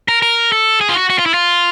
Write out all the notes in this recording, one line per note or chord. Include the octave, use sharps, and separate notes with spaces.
A#4
A#4
A4
G#4
F4
F#4
F#4
F4
E4
F4